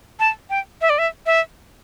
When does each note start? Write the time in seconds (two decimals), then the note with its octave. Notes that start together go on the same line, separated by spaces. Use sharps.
0.20 A5
0.50 G5
0.81 E5
0.90 D5
0.99 E5
1.26 E5